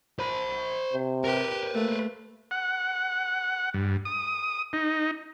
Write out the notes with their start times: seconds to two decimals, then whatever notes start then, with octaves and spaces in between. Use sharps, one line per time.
0.19 C5 B5
0.93 C3
1.24 G4 A#4 B4
1.75 A3 A#3
2.51 F#5
3.74 G2
4.05 D#6
4.73 D#4